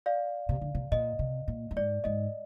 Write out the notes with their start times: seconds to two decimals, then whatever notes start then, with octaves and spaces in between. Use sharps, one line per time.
0.06 D5 F5
0.49 C3
0.61 D3
0.75 C3
0.92 A#2 D#5
1.19 C3
1.48 A#2
1.71 G2
1.76 G#2 D5
2.04 G#2 D#5